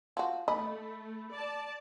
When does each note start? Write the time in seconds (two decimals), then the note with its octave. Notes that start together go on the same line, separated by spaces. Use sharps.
0.17 F3 F#4
0.48 A3 D#5 B5
1.33 D5 A5